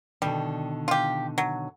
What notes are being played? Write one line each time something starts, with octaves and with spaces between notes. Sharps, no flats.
B2 D3 D#3 G3
F4 G4
F#3